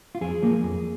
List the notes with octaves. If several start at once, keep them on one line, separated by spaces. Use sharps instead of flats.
F4
F2 G#4
F3 A#3
F2